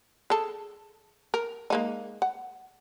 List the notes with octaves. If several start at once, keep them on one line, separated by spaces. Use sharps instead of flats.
G#4 A4
A#4
G#3 A#3 D#4
F#5